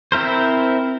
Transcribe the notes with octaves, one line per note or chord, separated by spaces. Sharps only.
C4 E4 A#4 C5